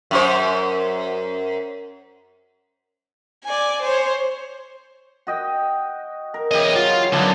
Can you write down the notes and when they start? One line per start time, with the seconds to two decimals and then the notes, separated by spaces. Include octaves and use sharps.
0.11 F#2 C5
3.45 D5 G#5
3.82 C5 C#5
5.27 F#4 D#5 G5
6.34 A#4
6.51 E2 C#3 G4 D#5
6.75 F#3 F4
7.13 F#2 D3 B3 D4 G#5